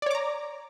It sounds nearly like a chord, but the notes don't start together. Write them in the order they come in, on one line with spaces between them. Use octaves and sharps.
D5 C#5 D6 A#5